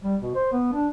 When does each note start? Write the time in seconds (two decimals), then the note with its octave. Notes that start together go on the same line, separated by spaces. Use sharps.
0.03 G3
0.21 B2
0.35 C5
0.52 B3
0.72 D4